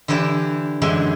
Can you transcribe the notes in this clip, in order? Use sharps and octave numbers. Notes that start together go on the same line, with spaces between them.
D3 E3 E4 G4 B4 D5
F#2 D3 E3 G3 G#3